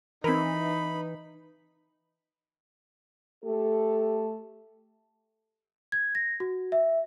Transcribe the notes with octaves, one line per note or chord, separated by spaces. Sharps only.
E3 C4 D#4 A#4 B5
A3 G4 A4
G#6
A#6
F#4
E5